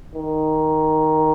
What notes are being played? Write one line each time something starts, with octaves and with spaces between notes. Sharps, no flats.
D#3